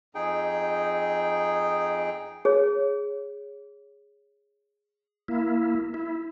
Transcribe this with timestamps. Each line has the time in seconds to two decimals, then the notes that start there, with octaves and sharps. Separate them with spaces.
0.15 F2 D#4 G#4 G5
2.45 G#4 C#5
5.28 A#3 E4
5.94 E4